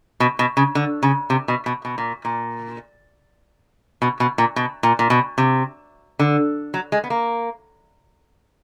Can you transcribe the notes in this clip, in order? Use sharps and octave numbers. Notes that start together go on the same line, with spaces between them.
B2
B2
C#3
D3
C#3
C3
B2
B2
B2
A#2
A#2
B2
B2
A#2
B2
A#2
A#2
B2
C3
D3
F#3
G#3
B3
A#3